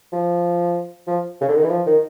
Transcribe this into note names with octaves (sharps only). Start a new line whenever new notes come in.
F3
F3
C#3
D3
D#3
E3
F3
D#3